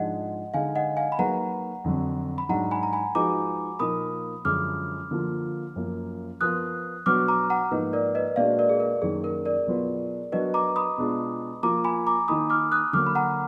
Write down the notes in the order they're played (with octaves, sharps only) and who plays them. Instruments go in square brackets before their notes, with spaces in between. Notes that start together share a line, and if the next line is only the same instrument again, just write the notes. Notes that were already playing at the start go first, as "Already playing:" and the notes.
Already playing: [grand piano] G#2 F3 G#3 D4 G#4 [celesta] D#5 F#5
[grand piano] D3 G#3 D#4 [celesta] F5 G#5
[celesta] D#5 F#5
F5 G#5
B5
[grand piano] F#3 A#3 D#4 G#4 B4 [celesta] F#5 A#5
[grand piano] F2 D3 F#3
[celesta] B5
[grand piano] G#2 F#3 D4 [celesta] F#5 A#5
[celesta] G#5 B5
A#5
G#5 B5
[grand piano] F3 G#3 D#4 F#4 B4 [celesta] A#5 D6
[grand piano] A#2 F3 A#3 D#4 A#4 [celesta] B5 D#6
[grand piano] F#2 D3 F3 G#3 [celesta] D6 F6
[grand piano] D3 F3 A#3 F4
F#2 F3 A#3
[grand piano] F3 B3 F4 A#4 [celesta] D#6 F#6
[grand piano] B2 F#3 D4 F#4 B4 [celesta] D6 F6
[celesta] A#5 D6
F#5 A#5
[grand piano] G#2 F3 A#3 D#4 [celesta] B4
[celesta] A#4 D5
B4 D#5
[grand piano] A#2 G#3 D4 F#4 [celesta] D5 F5
[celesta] A#4 D5
G#4
A#4
[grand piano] F#2 D#3 F#3 A#3 [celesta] G#4
[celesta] A#4
A#4 D5
[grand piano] B2 F#3 B3 F4 B4
[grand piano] F#3 B3 D4 F#4 A#4 [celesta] B4 D#5
[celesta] A#5 D6
B5 D#6
[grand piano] B2 G#3 D4 F4
[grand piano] F3 A#3 F4 [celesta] A#5 D6
[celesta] G#5 B5
A#5 D6
[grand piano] D#3 A#3 D#4 [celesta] B5 D#6
[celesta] D6 F6
D#6 F#6
[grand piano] D3 F#3 A#3 [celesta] D6 F6
[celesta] B5
F#5 A#5